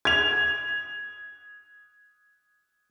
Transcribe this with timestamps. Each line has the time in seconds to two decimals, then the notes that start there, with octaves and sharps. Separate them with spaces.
0.05 G#6 F7